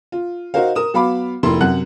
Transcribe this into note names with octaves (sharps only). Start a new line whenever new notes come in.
F4
D#4 F#4 A#4 C5 F5
A#4 D#6 E7
F#3 B3 F5 B5 D6
F1 A#3 E4 C6
F#2 C3 F#5 F#6 F#7